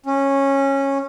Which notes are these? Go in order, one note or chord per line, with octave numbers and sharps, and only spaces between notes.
C#4